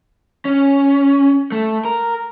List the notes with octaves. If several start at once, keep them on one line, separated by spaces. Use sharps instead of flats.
C#4
A3
A#4